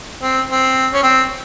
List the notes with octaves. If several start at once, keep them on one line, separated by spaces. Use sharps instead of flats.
C4
C4
C#4
C4